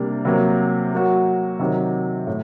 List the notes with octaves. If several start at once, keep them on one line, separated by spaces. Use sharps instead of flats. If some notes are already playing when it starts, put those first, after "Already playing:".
Already playing: C3 G3 A#3 D4
C3 F#3 A#3
F#3 A#3 F#4
C3 D#3 F#3
A2